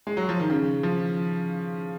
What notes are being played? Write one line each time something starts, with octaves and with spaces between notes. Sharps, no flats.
G#3
F#3
F3
D#3
C#3
F3